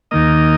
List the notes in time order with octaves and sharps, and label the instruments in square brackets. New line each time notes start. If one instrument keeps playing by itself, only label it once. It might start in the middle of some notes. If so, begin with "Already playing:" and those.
[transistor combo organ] D#2 D#3 A#3 D#5